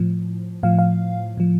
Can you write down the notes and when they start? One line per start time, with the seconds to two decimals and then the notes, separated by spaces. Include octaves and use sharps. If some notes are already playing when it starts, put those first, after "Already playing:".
Already playing: A2 F3
0.63 A2 F3 F5
0.79 F5
1.37 A2 F3